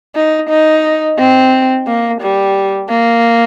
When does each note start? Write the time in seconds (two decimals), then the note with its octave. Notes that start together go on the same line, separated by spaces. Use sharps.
0.16 D#4
0.50 D#4
1.18 C4
1.87 A#3
2.22 G3
2.90 A#3